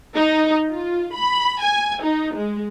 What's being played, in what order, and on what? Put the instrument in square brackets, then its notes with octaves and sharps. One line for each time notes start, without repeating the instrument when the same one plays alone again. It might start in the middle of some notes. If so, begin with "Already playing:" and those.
[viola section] D#4
F4
B5
G#5
D#4
G#3